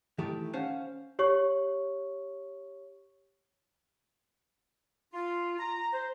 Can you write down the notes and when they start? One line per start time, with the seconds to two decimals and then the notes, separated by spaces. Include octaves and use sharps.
0.18 D#3 E3 A3 G4
0.53 C#4 C5 F5 F#5 A5
1.19 G4 C#5 C#6
5.13 F4
5.59 A#5
5.93 C5